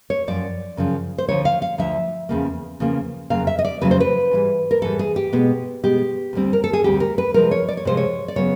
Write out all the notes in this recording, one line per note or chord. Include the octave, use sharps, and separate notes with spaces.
C#5
F#2 C#3 F3 D5
F#2 C#3 F3
C5
D2 D3 F3 C#5
F5
F5
D2 D3 F3 E5
E2 C#3 F3 A#3
E2 C#3 F3 A#3
F2 C#3 F#3 A#3 F5
E5
D#5
D5
F2 C#3 F#3 A#3 B4
C5
B4
G#2 E3 G3
A#4
G#2 E3 G3 A4
G#4
G4
B2 G#3 B3
B2 G#3 B3 G4
D2 D3 G3 C4
A#4
A4
G#4
D2 D3 G3 C4 G4
A#4
B4
C3 F3 G#3 A#4
C#5
D5
C#5
C3 F3 G#3 C5
C#5
D5
C#3 F#3 B3 C#5